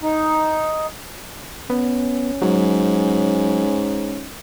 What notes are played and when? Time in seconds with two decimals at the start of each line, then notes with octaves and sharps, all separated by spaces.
0.02 D#4
1.70 B3 C#4
2.42 G#2 F#3